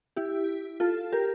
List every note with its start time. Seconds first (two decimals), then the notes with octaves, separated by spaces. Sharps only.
0.16 E4 G4
0.80 F4 A4
1.12 G4 A#4